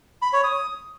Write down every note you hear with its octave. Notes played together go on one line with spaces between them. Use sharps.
B5
C#5
D#6